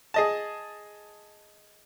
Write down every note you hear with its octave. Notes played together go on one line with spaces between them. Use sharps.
G#4 D#5 A5